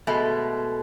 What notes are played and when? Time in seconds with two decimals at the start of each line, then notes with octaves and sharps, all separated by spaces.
0.07 B2 G#3 A3